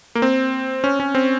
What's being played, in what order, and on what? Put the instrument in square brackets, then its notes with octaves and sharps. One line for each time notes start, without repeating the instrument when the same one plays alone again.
[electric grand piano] A#3
C4
C#4
C#4
C4